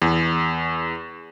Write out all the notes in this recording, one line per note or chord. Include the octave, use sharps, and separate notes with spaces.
E2